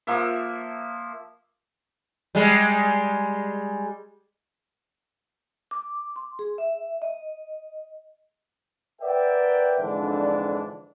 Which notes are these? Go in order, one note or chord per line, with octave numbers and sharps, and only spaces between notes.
F3 A#3 E5
G3 G#3
D6
C6
G#4
E5
D#5
A#4 B4 D5 E5 F#5 G5
F2 G#2 D3 E3 D4